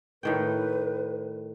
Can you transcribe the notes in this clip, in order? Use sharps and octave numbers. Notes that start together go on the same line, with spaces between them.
A2 D#3 B4 G5